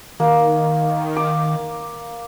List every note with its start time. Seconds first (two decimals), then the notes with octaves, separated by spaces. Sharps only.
0.20 D#3 A#3
1.16 D6